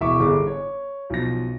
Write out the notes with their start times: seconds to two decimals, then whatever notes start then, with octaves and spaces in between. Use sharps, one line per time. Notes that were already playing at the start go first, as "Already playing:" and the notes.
0.01 E1 E3 E5 C#6 D6
0.20 G1 G#4 D6
0.47 C#5
1.10 B1 F3 A#6